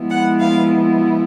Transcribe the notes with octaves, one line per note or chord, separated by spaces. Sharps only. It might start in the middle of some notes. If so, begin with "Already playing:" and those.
Already playing: F3 G#3 B3 E4
F#5
F5